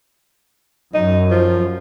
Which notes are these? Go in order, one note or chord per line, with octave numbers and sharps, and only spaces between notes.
F#2 D#4
F3